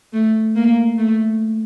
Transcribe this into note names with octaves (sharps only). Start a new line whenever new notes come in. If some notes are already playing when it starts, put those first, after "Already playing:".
A3
A#3
A3